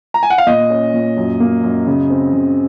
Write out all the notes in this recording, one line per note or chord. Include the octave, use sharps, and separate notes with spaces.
A#5
G#5
F#5
F5
A#2 D#5
C#4
A#2
F#2
A#3
F#2
C#3
C4
C#3